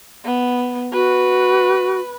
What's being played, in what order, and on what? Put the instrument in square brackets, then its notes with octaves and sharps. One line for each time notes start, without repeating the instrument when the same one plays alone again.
[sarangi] B3
[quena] F#4 [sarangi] B4